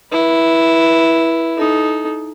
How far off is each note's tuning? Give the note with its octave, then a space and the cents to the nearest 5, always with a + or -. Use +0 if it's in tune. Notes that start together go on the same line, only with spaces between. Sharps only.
E4 +0 B4 -25
D#4 +0 A4 -30